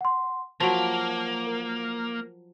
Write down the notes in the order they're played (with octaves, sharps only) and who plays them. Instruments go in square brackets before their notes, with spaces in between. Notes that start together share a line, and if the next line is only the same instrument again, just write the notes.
[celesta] F#5 C6
[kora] F3 F#3 [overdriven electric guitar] A#3 [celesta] A5
[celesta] A#4